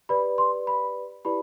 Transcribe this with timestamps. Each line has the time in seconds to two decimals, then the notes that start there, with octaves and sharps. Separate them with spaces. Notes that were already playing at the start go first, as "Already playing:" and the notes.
0.09 G4 B4 D5 B5
0.38 C6
0.67 B5
1.25 E4 G4 B4 D5 B5